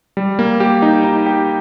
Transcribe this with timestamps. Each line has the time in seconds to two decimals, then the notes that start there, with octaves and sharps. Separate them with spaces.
0.17 G3
0.39 A#3
0.60 G4
0.82 D#4
1.04 D#4
1.26 G4